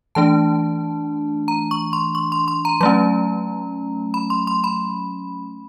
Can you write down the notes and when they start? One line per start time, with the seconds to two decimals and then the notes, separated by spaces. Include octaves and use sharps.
0.15 E3 A3 D4 A5
1.48 A#5
1.71 C#6
1.93 C6
2.15 C#6
2.32 C6
2.48 C6
2.65 A#5
2.81 F#3 A3 C#4 A#5
4.14 B5
4.30 C6
4.47 C6
4.64 B5